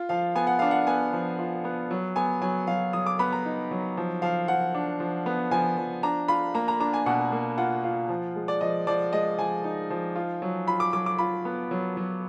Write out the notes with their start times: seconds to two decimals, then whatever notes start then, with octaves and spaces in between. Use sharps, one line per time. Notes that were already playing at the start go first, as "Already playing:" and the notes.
Already playing: F4
0.09 F3 F5
0.35 B3 G#5
0.47 F#5
0.59 D4 F5
0.71 F#5
0.87 B3 G#5
1.13 F3
1.39 F4
1.65 B3
1.91 F#3
2.16 B3 G#5
2.42 F#3 G#5
2.67 F#3 F5
2.93 F#3 D#6
3.06 D6
3.19 B3 B5
3.32 A#5
3.45 D#4
3.71 F#3
3.97 F3
4.22 F3 F5
4.48 F3 F#5
4.75 D4
5.00 F3
5.26 B3
5.51 F3 G#5
5.77 F3
6.03 D4 A#5
6.28 F4 B5
6.54 A#3 A#5
6.68 A#5
6.80 D4 A#5
6.94 G#5
7.06 B2 F#5
7.32 A#3
7.58 F4 F#5
7.84 F4
8.09 F3
8.35 G#3
8.48 D5
8.61 F3 D#5
8.87 F3 D5
9.13 G#3 D#5
9.38 F3 G#5
9.64 D#4
9.90 F3
10.15 F4
10.42 F#3
10.67 F4 B5
10.80 D6
10.93 F#3 D6
11.06 D6
11.19 F4 B5
11.45 B3
11.71 F#3
11.97 F#3